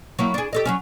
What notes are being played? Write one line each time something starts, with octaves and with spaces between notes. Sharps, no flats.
F#3 A#3 E4
D4 G#4
G4 A4 D#5
F#3 A#3 C#4